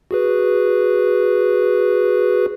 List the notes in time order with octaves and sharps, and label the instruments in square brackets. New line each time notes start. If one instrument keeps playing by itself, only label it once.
[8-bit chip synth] F#4 G#4 B4